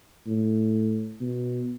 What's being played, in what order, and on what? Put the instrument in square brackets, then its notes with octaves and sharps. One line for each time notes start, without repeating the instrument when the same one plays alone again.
[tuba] A2
B2